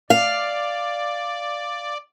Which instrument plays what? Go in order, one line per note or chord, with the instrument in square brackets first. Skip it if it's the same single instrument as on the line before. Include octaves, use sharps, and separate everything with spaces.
[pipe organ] D5 [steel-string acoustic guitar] F5